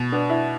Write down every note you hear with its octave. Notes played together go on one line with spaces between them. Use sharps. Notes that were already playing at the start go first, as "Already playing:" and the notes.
Already playing: B2
B3 D4
E4